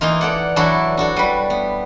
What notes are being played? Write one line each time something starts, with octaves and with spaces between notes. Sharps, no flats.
E3 A#3 D#4 F4
A4 D5 F#5
E3 F#3 D4 E4 F#4 A4
D4 F#4 A4
G3 B4
B3